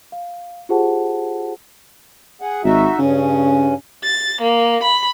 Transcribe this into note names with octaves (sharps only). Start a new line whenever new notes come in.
F5
F4 G4 G#4 C5 F#5 A5
G#4 F#5
G#1 D#4 F#4 E5
G2 C#3 C#4
A6
A#3
B5